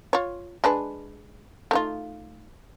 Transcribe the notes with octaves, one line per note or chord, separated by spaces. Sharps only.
F4 C#5
G#3 D4 B4
A3 D#4 F4